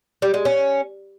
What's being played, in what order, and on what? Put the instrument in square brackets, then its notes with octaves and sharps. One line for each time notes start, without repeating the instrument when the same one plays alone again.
[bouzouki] G3
G#3
C#4